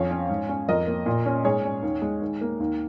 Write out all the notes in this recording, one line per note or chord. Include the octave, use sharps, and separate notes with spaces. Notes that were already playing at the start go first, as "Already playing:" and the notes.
Already playing: F2 C#4 C#5 F5
C#4
G#2
C#4
F2 A#4 D#5
A#3
A#2
C#4
G#2 G#4 C#5
C#4
D#2
G#3
D#2
A#3
D#2